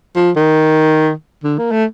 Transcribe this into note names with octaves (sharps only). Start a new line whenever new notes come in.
F3
D#3
D3
A#3
A3